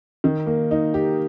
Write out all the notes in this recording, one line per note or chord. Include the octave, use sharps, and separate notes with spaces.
D#3
A#3
D#4
G4